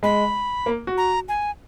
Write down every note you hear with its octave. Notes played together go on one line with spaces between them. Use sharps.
G#3 B5
A#3
F#4
A#5
G#5